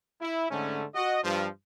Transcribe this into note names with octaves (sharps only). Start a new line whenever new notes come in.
E4
G#2 D3 A3 C#4
F#4 D#5
G2 F3